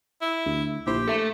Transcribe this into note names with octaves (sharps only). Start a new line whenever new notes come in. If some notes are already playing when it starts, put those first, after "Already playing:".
E4
D2
A#1 E4 G4 C5
A4 E5 A#5